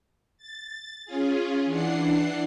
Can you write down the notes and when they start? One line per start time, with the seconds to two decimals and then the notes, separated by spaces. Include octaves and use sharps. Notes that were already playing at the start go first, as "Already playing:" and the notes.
0.38 A6
1.05 C#4 F4 G#4
1.66 E3 D4 F#5 C7